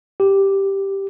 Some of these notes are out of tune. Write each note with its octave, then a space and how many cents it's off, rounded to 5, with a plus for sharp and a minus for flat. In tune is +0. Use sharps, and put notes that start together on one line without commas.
G4 +0